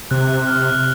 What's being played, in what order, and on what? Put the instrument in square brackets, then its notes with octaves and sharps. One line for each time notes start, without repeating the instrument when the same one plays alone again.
[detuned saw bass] C3 [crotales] F#6
[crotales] F#6
F#6
F6
F#6